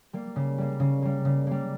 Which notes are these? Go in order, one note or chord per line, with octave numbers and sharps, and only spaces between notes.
G3 A#3
C#3
G3 A#3
C#3
G3 A#3
C#3
G3 A#3